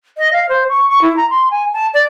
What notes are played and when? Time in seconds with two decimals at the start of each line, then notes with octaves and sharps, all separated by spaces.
0.18 D#5
0.33 F5
0.49 C5
0.69 C#6
0.89 C#6
1.02 E4
1.17 A#5
1.30 C6
1.51 G#5
1.73 A5
1.94 D5